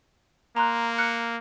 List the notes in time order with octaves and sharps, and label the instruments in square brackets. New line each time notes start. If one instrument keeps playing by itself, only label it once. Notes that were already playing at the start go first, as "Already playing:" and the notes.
[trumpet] A#3 [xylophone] A#5 C6 F#6
[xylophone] F6 F#6 C#7